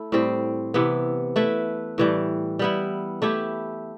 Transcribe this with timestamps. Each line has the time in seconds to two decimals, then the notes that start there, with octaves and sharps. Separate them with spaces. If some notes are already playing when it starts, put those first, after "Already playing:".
Already playing: A3 E4
0.12 A2 G3 C4
0.74 C3 E3 B3
1.36 A3 E4 B4
1.98 A2 E3 G3
2.59 G3 B3 E4
3.22 A3 E4 G4